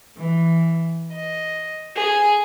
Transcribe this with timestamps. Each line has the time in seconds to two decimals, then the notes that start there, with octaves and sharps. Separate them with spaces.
0.18 E3
1.12 D#5
1.95 G#4